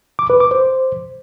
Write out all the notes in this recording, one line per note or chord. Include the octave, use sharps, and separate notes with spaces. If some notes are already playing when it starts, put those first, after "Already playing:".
D6
B4
D6
C5